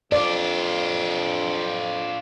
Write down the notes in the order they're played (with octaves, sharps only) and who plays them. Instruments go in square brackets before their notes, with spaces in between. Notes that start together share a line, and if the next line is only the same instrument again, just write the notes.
[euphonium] F2 [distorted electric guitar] D4 F4 [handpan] D5